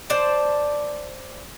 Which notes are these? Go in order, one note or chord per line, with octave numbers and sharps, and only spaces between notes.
C5 D5 A5